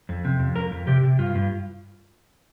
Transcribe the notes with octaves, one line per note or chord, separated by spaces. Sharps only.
F2
C3
F2
F2 A#4
F2
C3 G4
C3
G2 F4
G2